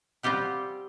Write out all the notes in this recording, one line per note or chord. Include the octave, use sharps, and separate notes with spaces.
G3 C4 F4 G4 F#5